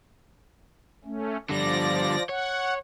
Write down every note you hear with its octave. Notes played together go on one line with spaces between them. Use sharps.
A3 C#4
D3 F3 G3 D5 A#6
C#5 F#5